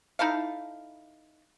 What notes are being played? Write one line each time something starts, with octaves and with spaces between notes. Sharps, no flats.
D#4 E4 A4 F5